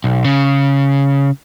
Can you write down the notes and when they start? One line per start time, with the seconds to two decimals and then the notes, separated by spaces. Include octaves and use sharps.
0.04 B1
0.25 C#3